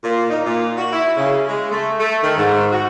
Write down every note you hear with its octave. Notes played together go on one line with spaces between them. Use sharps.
A#2
D#4
A#2
F#4
E4
C#3
G#3
A3
A3
D#3
G#2
F#4